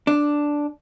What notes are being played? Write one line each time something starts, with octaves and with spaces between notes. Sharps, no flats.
D4